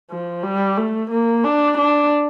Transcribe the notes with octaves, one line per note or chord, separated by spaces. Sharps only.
F3
G3
A3
A#3
D4
D4